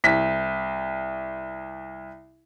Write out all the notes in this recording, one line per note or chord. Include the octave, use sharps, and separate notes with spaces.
C2 B6